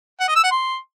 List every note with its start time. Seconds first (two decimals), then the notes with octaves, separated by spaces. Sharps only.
0.20 F#5
0.28 D#5
0.36 E6
0.44 F#5
0.51 C6